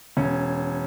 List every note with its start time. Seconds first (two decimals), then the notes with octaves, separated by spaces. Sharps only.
0.17 E1 C#4